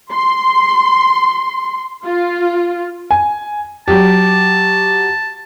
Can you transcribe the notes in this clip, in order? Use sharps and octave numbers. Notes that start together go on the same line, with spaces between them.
C6
F4
G#5
F#3 G4 A5